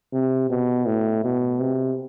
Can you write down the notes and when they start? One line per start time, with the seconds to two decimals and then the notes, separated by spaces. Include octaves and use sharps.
0.13 C3
0.50 B2
0.86 A2
1.24 B2
1.60 C3